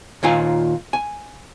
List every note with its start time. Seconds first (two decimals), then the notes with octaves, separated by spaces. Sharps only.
0.23 D#2 A#2 F4 G#5
0.93 G#5